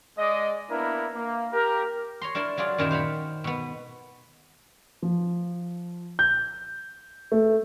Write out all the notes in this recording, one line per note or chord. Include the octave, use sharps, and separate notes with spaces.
G#3 D5 D#5
A#3 B3 D4 E4 A#4
A#3
G4 A#4
C#5 A#5 C6
D4 E4 A#4 D5 C6
F#3 F4 G#4 D5
F#2 A#2 D#3 F#3 E4 G4
C5 F5 F#5 B5
B2 B3
F3
G6
A3